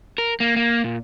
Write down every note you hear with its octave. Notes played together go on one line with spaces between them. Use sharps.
A#4
A#3
A#3
A#2